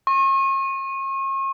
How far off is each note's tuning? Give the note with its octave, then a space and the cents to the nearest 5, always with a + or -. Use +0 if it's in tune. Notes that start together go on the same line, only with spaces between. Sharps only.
C#6 -40